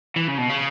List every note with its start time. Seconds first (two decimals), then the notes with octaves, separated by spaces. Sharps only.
0.16 E3
0.28 C#3
0.38 B2
0.49 C#3